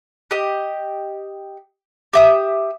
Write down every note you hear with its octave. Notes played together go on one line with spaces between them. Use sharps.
G4 D#5
G4 E5 D#6